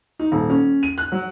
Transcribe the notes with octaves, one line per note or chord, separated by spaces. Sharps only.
D#4
D#1
C#4
D#7
F#6
F#3